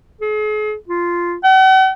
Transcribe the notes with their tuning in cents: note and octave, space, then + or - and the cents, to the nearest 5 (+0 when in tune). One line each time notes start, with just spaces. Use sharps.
G#4 +40
F4 -5
F#5 +45